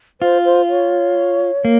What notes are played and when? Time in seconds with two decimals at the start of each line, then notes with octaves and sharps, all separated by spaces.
0.21 F4 C5
0.45 C5
0.69 C#5
1.65 A#3